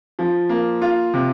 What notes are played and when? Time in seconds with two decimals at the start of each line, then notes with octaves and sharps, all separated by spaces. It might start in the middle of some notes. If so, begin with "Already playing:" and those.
0.19 F3
0.49 A#3
0.82 F4
1.14 C3